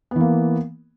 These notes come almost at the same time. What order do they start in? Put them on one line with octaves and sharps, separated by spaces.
B3 E3 A#3